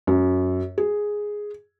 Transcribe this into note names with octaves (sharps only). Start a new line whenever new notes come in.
F#2
G#4